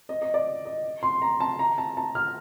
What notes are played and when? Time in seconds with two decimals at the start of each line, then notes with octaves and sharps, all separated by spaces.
0.09 D#5
0.22 D#5
0.34 D5
0.65 D#5
1.03 C6
1.22 A#5
1.40 A5
1.59 A#5
1.78 A5
1.97 A5
2.15 F6